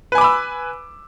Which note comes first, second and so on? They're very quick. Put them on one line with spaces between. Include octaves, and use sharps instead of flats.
B4 G#5 D6 B5 E6